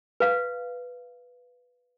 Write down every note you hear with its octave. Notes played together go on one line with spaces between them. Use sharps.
B4 F5